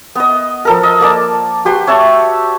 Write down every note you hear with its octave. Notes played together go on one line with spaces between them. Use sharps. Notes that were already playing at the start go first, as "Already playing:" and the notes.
B3 D#5
F3 A4 A#4
D#5
A#3 D5 A5
F#4 G4 B4 C6
C#5 E5 A5 C#6